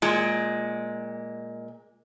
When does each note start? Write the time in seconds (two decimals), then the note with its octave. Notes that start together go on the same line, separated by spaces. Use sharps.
0.02 A#2 G#3